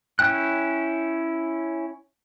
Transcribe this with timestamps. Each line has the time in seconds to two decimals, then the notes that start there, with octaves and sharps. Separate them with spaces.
0.19 C#4 E4 G5 F#6